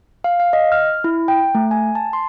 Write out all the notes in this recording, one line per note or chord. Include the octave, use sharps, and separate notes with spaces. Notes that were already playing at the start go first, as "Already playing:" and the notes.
F5
F5
D#5
F6
E4
G5
A3
G#5
A5
C6